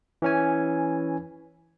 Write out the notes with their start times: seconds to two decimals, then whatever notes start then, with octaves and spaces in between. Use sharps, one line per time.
0.22 E3 C#4 G#5